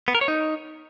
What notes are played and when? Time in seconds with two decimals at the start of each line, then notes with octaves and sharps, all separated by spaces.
0.08 B3
0.15 A#4
0.21 C#5
0.28 D#4